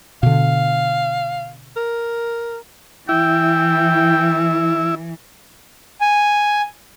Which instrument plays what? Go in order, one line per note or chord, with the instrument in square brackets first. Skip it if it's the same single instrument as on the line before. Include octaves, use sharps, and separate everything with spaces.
[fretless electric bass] B2 D3 [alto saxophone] F5
[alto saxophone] A#4
[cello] E3 [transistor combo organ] E4 [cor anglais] G5
[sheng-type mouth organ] G#5